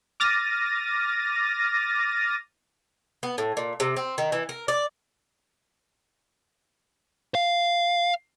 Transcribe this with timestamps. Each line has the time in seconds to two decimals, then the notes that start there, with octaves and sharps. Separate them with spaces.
0.20 D6 F6 A6 A#6 D#7
3.23 B3
3.38 A2
3.57 A#2
3.80 C3
3.97 C4
4.18 D#3
4.32 E3
4.49 A#4
4.68 D5
7.35 F5